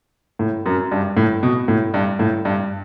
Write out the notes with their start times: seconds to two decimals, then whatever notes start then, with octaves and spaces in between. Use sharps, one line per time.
0.39 A2
0.66 F#2
0.91 G2
1.17 A2
1.43 B2
1.68 A2
1.94 G2
2.19 A2
2.45 G2